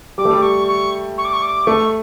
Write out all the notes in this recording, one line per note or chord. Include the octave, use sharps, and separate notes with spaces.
G3 D6
A3
G3
C#6
C#6
C#6
D6
C#6
D6
A3 C#6